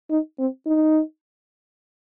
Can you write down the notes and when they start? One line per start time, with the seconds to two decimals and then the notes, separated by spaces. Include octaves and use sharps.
0.11 D#4
0.39 C4
0.67 D#4